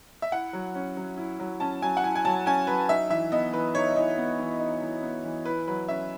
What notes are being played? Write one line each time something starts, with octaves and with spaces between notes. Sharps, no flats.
E5
E4 F#5
F#3
C#4
F#3
E4
F#3
C#4 A5
F#3 G#5
F#5
E4 G#5
G#5
F#3 A5
C#4 G#5
F#3 B4
D#4 E5
E3 E5
B3 D#5
E3 B4
D#4 C#5
E3 D#5
B3
E3
D#4
E3
B3
E3
E4 B4
F#3 B4
C#4 E5